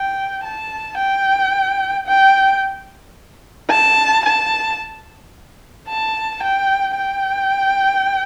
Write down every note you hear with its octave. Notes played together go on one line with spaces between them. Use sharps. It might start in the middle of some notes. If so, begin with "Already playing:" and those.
Already playing: G5
A5
G5
G5
A5
A5
A5
G5
G5